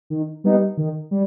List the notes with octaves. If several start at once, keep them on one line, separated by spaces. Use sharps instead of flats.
D#3
G3 B3 D#4
D#3
G3